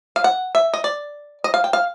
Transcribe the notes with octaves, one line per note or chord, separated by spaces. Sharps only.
F5
F#5
E5
D#5
D5
D#5
F5
G5
F5